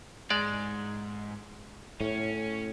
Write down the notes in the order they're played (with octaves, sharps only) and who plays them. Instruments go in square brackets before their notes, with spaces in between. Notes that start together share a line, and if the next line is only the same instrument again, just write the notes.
[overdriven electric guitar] G#2 [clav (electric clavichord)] G#3 D5
[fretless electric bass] A2 [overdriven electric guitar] C#4